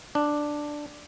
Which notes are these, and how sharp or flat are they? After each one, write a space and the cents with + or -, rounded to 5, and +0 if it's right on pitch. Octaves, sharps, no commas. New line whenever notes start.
D4 +5